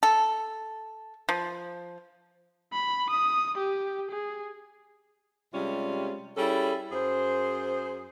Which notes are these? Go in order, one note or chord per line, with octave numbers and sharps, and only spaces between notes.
A4
F3
B5
D#6
G4
G#4
C3 G3 G#3 C#4 F4
G3 C#4 E4 G#4 A4
F#2 G#4 C5